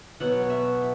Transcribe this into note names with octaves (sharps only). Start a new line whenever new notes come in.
B2 F#3 B3 F#5
E5